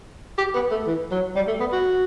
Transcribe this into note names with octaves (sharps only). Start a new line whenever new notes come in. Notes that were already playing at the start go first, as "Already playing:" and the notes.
G4
B3
A3
E3
F#3
G3
A3
B3
F#4